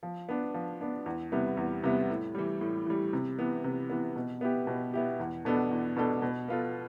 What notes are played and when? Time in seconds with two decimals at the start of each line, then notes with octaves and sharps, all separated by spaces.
0.03 F3
0.29 B3 D4
0.54 F3
0.81 B3 D4
1.06 E2
1.32 C3 G3 B3 E4
1.57 E2
1.84 C3 G3 B3 E4
2.10 A2
2.35 E3 G3
2.61 A2
2.86 E3 G3
3.13 C3
3.39 E3 B3
3.64 C3
3.90 E3 B3
4.16 B2
4.41 B3 E4 G4
4.67 B2
4.94 B3 E4 G4
5.20 E2
5.45 B2 B3 D4 A4
5.71 E2
5.97 B2 B3 D4 A4
6.22 B2
6.48 B3 F4 A4